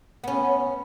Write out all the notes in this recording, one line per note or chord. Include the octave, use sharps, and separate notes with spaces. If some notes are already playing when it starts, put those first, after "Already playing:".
B3 C#4